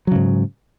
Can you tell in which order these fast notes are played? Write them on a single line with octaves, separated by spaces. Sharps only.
F#3 C#3 G#2